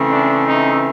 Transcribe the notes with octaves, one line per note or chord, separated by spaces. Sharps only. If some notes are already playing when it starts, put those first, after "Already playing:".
Already playing: C#3 E3 A3 C4
D4
D#4